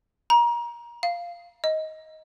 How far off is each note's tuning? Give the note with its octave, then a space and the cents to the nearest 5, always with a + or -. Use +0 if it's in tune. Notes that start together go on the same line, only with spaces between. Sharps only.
A#5 +30
F5 -5
D#5 +15